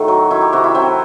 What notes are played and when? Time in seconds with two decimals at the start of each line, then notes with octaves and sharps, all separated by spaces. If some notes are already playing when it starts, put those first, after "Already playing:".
Already playing: A2 D#3 F#4 A4
0.08 F#3
0.31 D#3 E4
0.41 G4
0.53 C3 F#4
0.64 E4
0.75 F#3 C4